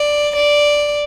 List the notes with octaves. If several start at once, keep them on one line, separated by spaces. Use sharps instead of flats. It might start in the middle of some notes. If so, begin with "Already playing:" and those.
Already playing: D5
D5